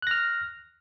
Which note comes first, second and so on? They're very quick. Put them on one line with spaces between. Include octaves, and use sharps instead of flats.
F#6 A#6 F6